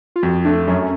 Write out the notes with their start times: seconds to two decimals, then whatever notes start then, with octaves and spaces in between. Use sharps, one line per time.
0.16 F4
0.23 F2 F#4
0.45 A3 D4
0.67 F#2 C#4